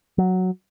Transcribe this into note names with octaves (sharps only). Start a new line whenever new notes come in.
F#3